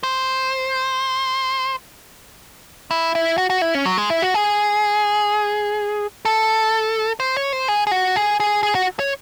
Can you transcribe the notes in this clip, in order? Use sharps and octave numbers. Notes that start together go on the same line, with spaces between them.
C5
E4
E4
F#4
F#4
E4
C#4
F#3
G#3
E4
F#4
G#4
A4
C5
C#5
C5
G#4
G#4
F#4
G#4
G#4
G#4
F#4
C#5